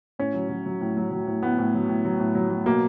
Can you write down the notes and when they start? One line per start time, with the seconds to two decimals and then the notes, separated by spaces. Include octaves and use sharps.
0.19 A2 C#4
0.34 F#3
0.49 F#3
0.66 F#3
0.81 A2
0.97 F#3
1.11 F#3
1.27 A2
1.42 A2 B3
1.59 A2
1.74 F#3
1.89 A2
2.05 F#3
2.20 A2
2.35 F#3
2.50 F#3
2.66 B2 A#3